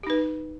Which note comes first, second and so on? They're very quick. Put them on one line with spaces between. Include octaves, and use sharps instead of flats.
G4 D#4 B4